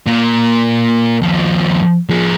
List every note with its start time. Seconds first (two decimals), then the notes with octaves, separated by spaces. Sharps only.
0.07 A#2
1.21 D#2 F3
2.09 F3 G#4